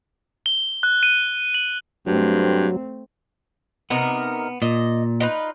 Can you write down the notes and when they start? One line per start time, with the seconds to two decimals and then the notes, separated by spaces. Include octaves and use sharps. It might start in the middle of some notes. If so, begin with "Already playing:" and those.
0.46 G7
0.83 F#6
1.03 D#7
1.54 F#7
2.07 G2 F#3 A3 C4
3.90 C3 B3 D#4 A#4
4.62 A#2 D#5
5.20 D#4 F4 B4